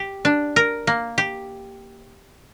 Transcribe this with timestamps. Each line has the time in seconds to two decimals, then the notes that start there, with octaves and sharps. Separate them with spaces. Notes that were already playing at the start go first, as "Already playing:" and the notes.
Already playing: G4
0.25 D4
0.56 A#4
0.87 A#3
1.18 G4